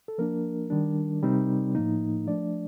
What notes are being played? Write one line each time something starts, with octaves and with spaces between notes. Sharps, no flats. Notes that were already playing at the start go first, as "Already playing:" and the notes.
A4
F3 A#3 D4 A#4
D#3 G3 D4
C3 G3 C4 D#4
A2 F3 A#3 D#4
F3 A3 D4 D5